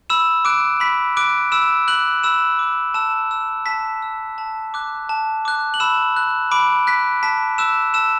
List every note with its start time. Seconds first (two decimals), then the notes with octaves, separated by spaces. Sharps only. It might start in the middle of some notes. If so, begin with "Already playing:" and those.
0.10 B5 E6 E7
0.45 D6 F#6 D7
0.80 B5 B6
1.17 D6 F#6 D7
1.52 B5 E6 E7
1.88 D6 F#6 F#7
2.23 B5 E6 E7
2.59 D6 F#6
2.94 A5 E6 E7
3.31 E6
3.66 A5 B6
4.02 E6
4.38 A5
4.74 D6 F#6
5.09 A5
5.45 D6 F#6
5.74 F#7
5.80 B5 E6 E7
6.17 F#6
6.51 B5 D6 D7
6.87 F#6 B6
7.23 A5 B6
7.58 D6 E6 F#6 E7
7.94 A5 E6 E7